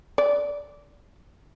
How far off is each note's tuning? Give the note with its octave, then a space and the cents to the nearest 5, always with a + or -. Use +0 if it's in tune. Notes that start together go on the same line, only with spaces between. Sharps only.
D5 -15